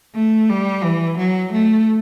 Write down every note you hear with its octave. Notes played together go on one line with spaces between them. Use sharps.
A3
G3
E3
F#3
A3